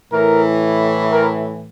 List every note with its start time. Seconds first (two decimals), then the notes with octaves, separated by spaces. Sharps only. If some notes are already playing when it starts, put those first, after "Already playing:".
0.12 A2 E3 A#4
1.12 A#4